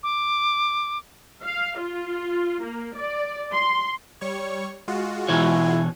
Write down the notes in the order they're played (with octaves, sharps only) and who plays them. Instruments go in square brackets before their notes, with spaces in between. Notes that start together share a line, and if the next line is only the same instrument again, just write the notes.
[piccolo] D6
[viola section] F5
F4
A#3
D5
C6
[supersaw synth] G3 C#5 C#6
G#3 F4 F#4
[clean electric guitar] B2 E3 C#5 [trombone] E4